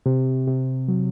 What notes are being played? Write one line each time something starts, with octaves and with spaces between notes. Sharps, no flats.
C3
C3
F#3